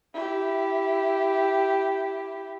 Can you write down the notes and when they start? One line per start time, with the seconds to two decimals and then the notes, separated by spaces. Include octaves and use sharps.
0.14 E4 G4